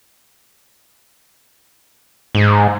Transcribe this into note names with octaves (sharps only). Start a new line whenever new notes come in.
G#2